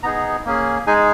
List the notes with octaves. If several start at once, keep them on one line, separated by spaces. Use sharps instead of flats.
B3 D#4 G#4 A#5
A#3 C#4 G#4
G#3 D#4 G#4 G#5